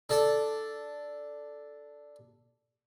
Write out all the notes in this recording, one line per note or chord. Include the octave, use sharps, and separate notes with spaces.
D4 A4 D5